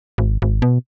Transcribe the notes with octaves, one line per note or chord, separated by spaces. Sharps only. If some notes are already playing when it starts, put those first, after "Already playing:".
G#1
G#1
B2